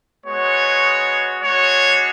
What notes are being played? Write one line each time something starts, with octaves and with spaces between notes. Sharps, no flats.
G#3 B3 F#4 C#5
G#3 D4 F#4 C#5